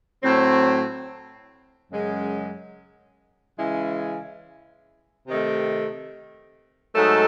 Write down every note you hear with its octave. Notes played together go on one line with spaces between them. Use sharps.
A2 F#3 C4
F#2 C#3 G#3
C#3 E3 G#3 C#4 E4
C3 D#3 A3
G#2 F#3 A3 D#4 A4